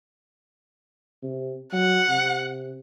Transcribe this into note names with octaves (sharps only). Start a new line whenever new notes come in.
C3
F#3 F#5
C3